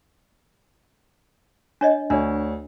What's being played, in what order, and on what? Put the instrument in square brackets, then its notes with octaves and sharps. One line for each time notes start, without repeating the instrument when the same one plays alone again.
[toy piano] D4 C#5 D#5
[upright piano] D2 C#5 [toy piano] D4